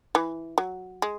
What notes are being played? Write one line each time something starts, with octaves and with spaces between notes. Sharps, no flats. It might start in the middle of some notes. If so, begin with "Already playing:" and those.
E3
F#3
G#3